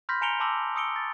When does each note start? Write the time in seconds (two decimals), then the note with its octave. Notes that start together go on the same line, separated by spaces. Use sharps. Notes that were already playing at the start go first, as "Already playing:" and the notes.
0.09 B5 C6 F6 G6 A#6 B6
0.21 G#5 A#5 C#7 D7 F7 G7
0.40 A5 C6 D6 E6 A#6 F#7
0.75 C#6 D#6 E6 C#7 D7 G7
0.96 A6